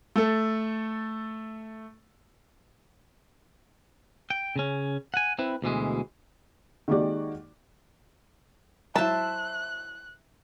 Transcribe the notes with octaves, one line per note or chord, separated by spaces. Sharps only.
A3 A4
G5
C#3 C#4
F#5 G#5
C4 E4 B4
D2 B2 E3 G#3
D#3 G#3 A#3 F#4 G4 D5
F#3 E4 C5 E5 A5 F#6